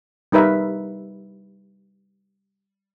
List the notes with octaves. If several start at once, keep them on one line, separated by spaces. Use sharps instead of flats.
G3 D#4 A#4 B4 E5